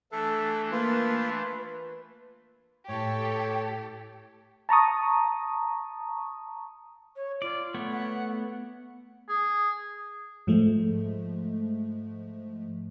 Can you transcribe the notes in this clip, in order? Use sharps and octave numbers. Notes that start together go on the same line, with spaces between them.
E3 A3 D4 A4
A#3 F4 B4
A2 G4 A4 C#5
A5 A#5 C#6 D#6
C#5
F4 D5
A3 B3 C#5
F#5
G#4
G#2 F3 G#3 A3